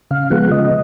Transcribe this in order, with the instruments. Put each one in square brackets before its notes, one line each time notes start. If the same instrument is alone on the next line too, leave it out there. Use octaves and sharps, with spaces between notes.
[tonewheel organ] C#3 F5
F3 G#3 B3 F#5
C#3 D#5